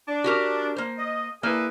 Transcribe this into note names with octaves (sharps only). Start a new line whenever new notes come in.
D4
F#4 G4 A#4
A#3 C5
D#5
A#3 E4 G#4 B4